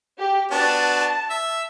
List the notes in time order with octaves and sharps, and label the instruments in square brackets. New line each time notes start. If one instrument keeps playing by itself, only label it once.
[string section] G4
[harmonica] B3 D4 F#4 [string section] A5
[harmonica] E5